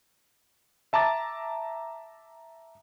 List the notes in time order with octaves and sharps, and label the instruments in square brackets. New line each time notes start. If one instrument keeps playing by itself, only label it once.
[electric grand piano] E5 A5 A#5 D6 A6